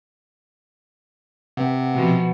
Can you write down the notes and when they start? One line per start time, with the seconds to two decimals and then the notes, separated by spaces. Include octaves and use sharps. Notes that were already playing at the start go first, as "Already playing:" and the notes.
1.57 C3 B4 F#5
1.95 B2 F3